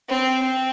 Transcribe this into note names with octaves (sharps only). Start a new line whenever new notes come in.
C4
C4